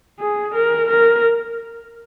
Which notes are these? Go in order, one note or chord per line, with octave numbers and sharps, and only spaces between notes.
G#4
A#4
A#4